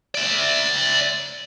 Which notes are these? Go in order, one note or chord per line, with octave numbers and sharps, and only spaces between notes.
D5 E5